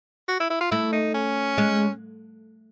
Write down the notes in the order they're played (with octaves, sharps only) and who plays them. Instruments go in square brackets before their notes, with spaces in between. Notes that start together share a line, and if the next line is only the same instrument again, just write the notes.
[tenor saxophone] F#4
E4
E4
F4
[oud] A3 [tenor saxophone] E4
[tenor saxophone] D#4
C#4
[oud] G#3